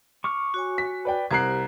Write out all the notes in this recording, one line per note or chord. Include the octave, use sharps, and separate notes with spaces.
C#6 D6 F6
F#4 C#5 G#5
B6
B4 D5 G5
C2 G4 A#4 C5 F#6 G#6 C7